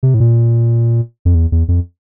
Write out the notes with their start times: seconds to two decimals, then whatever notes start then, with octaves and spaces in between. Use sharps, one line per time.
0.03 C3
0.14 A2
0.20 A#2
1.25 F2
1.35 E2
1.52 E2
1.68 F2